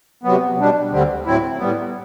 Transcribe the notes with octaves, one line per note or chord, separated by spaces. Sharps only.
C3 F#3 B3
B2 G3 D4
D2 D3 G3 C4
A2 F#3 C4 E4
A2 G3 B3